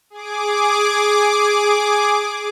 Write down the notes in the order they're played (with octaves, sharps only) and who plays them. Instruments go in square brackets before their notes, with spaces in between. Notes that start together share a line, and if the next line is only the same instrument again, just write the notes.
[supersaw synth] G#4 D6